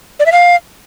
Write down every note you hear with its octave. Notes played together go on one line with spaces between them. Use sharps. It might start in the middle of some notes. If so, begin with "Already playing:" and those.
D5
E5
F5